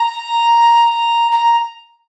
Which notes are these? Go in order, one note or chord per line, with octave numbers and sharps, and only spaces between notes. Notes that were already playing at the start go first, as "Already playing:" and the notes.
Already playing: A#5
A#5